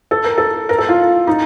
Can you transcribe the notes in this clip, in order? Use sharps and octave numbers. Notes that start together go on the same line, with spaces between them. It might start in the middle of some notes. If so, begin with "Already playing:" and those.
A4
A#4
A4
A#4
A4
F4
D#4